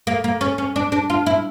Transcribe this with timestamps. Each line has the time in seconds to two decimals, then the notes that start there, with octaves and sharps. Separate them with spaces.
0.07 A#3
0.24 A#3
0.41 C#4
0.58 C#4
0.76 D4
0.92 D4
1.10 F4
1.26 E4